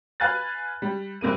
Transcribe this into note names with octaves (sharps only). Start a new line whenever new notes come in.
B4 F5 G#5 F#6 A6
G3
G2 C3 A#3 D#7